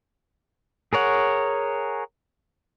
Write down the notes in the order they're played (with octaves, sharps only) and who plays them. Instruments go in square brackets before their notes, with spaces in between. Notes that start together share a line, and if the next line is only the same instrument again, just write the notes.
[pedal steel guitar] G#4 A#4 C#5 F#5